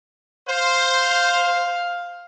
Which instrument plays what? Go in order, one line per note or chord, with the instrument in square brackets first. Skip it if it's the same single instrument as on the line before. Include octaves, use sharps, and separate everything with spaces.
[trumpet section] C5 [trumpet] F5